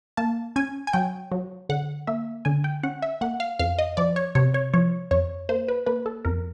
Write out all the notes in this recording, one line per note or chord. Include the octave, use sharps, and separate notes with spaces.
A#3 A5
C#4 G#5
G#5
F#3 G5
F#3
D3 F#5
A#3 E5
D3 G#5
G5
C#4 F#5
E5
A#3 F#5
F5
F2 F5
D#5
F3 D5
C#5
C3 C#5
C#5
F3 C#5
F2 C#5
A#3 C5
B4
A#3 B4
A4
F2 A#4